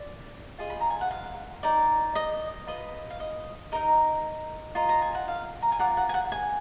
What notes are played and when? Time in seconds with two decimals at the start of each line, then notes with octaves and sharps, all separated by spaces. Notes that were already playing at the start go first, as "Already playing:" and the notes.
Already playing: D5
0.58 F4 G#4 D#5
0.70 B5
0.80 A#5
0.90 G#5
1.01 F#5
1.11 F5
1.63 D#4 A#4 D5
2.15 D#5
2.67 F4 B4 D#5
3.10 F5
3.20 D#5
3.72 D#4 A#4 D#5
4.75 F4 A#4 D#5
4.89 A#5
5.02 G#5
5.15 F#5
5.28 F5
5.62 A#5
5.72 G#5
5.79 F4 A#4 D5 F#5
5.97 F#5
6.09 G#5
6.14 F#5
6.32 G#5